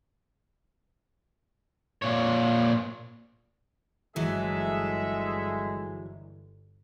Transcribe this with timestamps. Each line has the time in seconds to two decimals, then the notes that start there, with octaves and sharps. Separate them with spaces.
2.02 A#2 C#5
4.16 G1 E3 F#3 G#3 G#4 A4 E5